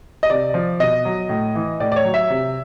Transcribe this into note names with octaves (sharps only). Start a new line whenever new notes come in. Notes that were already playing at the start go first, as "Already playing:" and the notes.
D#5
C3 D5
F3
B2 D#5
F#3
A2
E3
A2 D5
D5
C#5
F#3
E5
C3